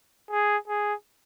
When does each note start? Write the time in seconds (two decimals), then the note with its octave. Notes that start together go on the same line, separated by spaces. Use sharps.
0.31 G#4
0.68 G#4